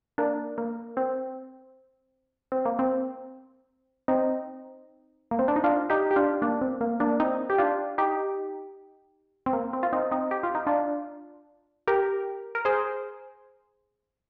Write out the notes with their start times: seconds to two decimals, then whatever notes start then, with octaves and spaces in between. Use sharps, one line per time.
0.18 A#3 D4
0.58 A#3
0.97 C4
2.52 C4
2.65 A#3
2.79 C4
4.08 C4 D#4
5.31 A#3
5.39 C4
5.48 D4
5.56 D#4
5.64 D4 F4
5.90 D#4 G4
6.11 G4
6.16 D4 F4
6.42 A#3 D4
6.61 C4
6.81 A#3
7.00 A#3 D4
7.20 C4 D#4
7.50 G4
7.58 D4 F4
7.98 D#4 G4
9.46 C4
9.53 A#3
9.73 C4
9.83 F4
9.93 C4 D#4
10.11 C4 D#4
10.31 G4
10.43 F4
10.55 D#4
10.67 D4 F4
11.87 G4 A#4
12.55 A#4
12.65 G#4 C5